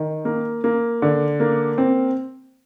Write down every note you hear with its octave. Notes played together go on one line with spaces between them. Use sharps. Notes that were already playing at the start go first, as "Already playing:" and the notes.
Already playing: D#3
A#3
A#3
D3
A#3
C4